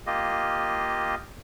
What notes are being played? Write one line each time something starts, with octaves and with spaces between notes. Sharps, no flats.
A#3 F4 G4 D#5